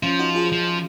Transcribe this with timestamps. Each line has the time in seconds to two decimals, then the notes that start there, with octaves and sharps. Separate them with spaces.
0.02 F3 C#4 F4
0.19 D#4 F#4
0.35 F4 G#4
0.52 F3